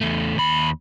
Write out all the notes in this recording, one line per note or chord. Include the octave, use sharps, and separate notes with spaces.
E2 A3
D#2 B5